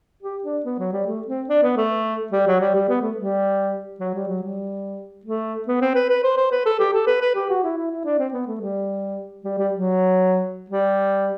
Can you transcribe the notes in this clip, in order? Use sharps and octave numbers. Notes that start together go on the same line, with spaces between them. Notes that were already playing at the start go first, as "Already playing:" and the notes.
G4
D4
B3
F#3
G3
A3
C4
D4
B3
A3
G3
F#3
G3
G3
B3
A3
G3
F#3
G3
F#3
G3
A3
B3
C4
B4
B4
C5
C5
B4
A4
G4
A4
B4
B4
G4
F#4
E4
E4
E4
D4
C4
B3
A3
G3
G3
G3
F#3
G3